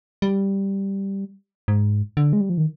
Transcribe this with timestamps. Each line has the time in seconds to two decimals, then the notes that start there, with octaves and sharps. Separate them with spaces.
0.22 G3
1.68 G#2
2.17 D3
2.33 G#3
2.41 G3
2.50 F3
2.58 D#3